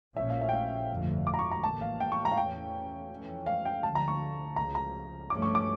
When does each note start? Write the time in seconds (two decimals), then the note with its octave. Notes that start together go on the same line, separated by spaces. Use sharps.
0.17 A#1 A#2 F3 C#4 E5
0.30 F5
0.41 E5
0.49 G5
0.53 F5
0.90 G1 F2 D3 F3 A3
1.27 D6
1.34 A#5
1.39 C#6
1.51 A#5
1.63 A1 A2 E3 A#3 A5
1.81 F5
2.00 G5
2.12 C#6
2.25 A#5
2.31 F5
2.37 E2 E3 A3 C#4 G5
3.10 F2 E3 A3 C#4
3.46 F5
3.65 G5
3.83 D2 D3 F3 A5
3.95 A#5
4.08 C#6
4.56 C#2 C#3 F3 A#5
4.75 A#5
5.30 G2 F3 A3 C#4 D6
5.42 C#6
5.55 D6